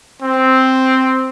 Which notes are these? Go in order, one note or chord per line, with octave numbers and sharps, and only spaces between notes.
C4